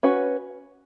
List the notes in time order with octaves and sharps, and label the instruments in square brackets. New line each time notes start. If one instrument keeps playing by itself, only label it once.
[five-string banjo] C#4 F#4 B4